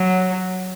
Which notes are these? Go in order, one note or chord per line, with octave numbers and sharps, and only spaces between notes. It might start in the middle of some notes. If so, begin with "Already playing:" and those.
Already playing: F#3